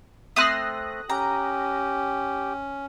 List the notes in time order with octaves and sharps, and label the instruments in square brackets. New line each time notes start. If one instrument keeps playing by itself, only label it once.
[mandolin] A3 C4 C6 [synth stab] D#6 F#6 A#6
[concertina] C#4 [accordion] G4 G5 [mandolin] A#5